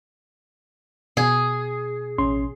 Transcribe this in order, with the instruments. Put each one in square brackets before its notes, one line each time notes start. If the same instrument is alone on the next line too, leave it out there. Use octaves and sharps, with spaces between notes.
[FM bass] B2 [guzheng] G#4
[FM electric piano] A1 C#4 C6